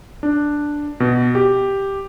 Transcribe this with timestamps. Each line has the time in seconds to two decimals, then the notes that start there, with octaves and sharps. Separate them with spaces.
0.23 D4
1.00 B2
1.35 G4